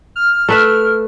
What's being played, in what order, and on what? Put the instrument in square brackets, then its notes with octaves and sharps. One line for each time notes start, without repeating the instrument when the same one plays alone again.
[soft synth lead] F6
[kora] A3 B4 E5